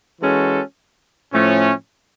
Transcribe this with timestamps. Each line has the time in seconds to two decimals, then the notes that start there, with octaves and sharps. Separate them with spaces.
0.21 E3 G#3 C#4 F#4 A4
1.33 A2 F3 A3 C#4